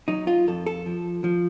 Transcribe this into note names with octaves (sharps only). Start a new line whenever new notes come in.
F#3 D#4
F4
F2 A4
A4
F3
F3